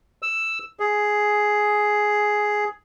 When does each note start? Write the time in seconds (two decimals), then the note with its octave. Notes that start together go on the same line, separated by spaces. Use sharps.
0.22 E6
0.80 G#4